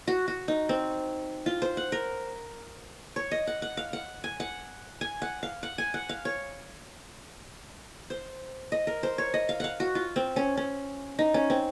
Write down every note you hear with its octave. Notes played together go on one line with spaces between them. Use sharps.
F#4
F#4
D#4
C4
F4
C5
F#5
A#4
C#5
D#5
F#5
F#5
F5
F#5
G#5
F#5
G#5
F#5
F5
F#5
G#5
F#5
F5
C#5
C5
D#5
A#4
C5
C#5
D#5
F5
F5 F#5
F#4
F4
C4
C#4
C#4
D#4
C#4
C4